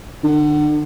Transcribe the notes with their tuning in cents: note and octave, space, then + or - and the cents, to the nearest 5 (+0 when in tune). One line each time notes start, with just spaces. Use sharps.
D3 +35